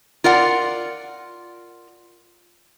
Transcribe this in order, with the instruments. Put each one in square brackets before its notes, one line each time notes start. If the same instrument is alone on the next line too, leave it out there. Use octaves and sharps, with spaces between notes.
[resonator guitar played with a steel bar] F4 A#4 D5 F#5